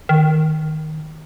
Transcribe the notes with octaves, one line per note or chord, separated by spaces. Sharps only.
D#3